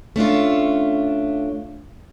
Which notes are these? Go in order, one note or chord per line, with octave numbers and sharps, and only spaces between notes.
A3 C#4 D4 F4